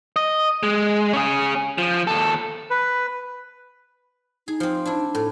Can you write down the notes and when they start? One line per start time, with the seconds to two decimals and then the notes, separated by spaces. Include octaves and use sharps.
0.16 D#5
0.63 G#3
1.13 C#4 G#4
1.78 F3
2.07 D#2 A4
2.70 B4
4.48 D#4 G#4
4.60 F3 C4
4.85 D4 E4
5.15 A2 A4